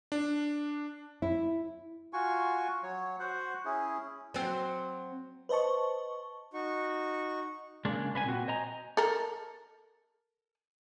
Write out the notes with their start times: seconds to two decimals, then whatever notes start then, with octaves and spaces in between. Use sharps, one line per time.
0.12 D4
1.22 E4
2.13 F4 F#4 G#5 C#6
2.83 F#3 C#5
3.19 F#4 C5 F#5
3.65 C#4 E4 G#4
4.34 F#3 C4
5.49 B4 C5 D#5 A5 C#6
6.54 D#4 F#4 C#6
7.85 C#3 G#3 A#3 D4
8.14 C2 B4 E5 G#5
8.26 A#2 C4 F#4
8.48 C5 D#5 G#5 A#5
8.97 A4 A#4